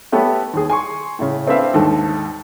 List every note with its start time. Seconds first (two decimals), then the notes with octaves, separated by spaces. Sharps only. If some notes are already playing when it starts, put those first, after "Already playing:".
0.12 A3 B3 G4 A4 B4 C#5
0.54 D#2 G#4
0.70 G#5 C6 C#6
1.19 A2 C#3
1.47 A3 C4 D4 B4 E5 F5
1.74 D#2 G#2 D3 A4